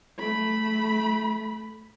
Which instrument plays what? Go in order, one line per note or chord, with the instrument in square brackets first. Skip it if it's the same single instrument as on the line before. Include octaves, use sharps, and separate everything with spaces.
[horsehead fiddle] A3 B5